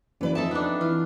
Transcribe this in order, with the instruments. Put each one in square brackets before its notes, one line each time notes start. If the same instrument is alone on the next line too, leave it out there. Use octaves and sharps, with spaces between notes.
[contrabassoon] F#1 [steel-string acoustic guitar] E3 B4 D5
[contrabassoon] F2 [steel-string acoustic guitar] C4 D#4 E5 [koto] A4 A5
[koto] B3 D4
[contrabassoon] E3 [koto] F4